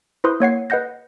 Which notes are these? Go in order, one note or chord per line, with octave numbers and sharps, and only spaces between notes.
E4 B4 C5 C6 D#6
A#3 C#5 F#5 C7
B4 D#5 F#5 G6 A#6